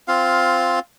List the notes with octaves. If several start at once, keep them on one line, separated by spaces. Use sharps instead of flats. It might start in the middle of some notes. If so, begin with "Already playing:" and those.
C4 F4 F5